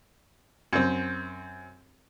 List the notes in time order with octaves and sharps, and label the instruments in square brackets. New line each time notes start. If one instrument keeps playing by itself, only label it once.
[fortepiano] F#2 C4